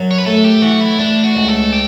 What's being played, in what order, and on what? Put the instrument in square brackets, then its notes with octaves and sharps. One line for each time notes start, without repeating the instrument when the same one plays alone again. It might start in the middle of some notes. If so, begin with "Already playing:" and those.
Already playing: [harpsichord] F#2 F#3
[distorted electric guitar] C#5
B4
[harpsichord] A3 [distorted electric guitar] A4
[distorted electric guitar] G4
[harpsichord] E3 [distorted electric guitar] F#4
[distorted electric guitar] E4
[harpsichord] A3 [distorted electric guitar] D4
[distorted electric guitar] F#4
[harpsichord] C#2
[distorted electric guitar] A4
G4